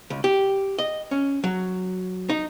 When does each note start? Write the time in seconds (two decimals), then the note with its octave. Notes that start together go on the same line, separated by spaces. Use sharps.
0.10 C#2
0.24 G4
0.79 D#5
1.11 C#4
1.44 F#3
2.29 D#4